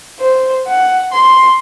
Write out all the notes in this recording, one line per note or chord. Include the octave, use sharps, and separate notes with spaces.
C5
F#5
C6